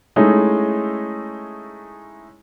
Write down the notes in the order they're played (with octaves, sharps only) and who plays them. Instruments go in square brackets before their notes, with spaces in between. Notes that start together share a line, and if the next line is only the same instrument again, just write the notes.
[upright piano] G#3 A3 C#4 D#4 E4 G#4